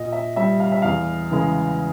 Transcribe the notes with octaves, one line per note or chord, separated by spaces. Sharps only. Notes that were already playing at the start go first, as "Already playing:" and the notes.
Already playing: A#2 D#5
E5
G3 E5
F5
E5
E2 F5
C#3 E3 G#3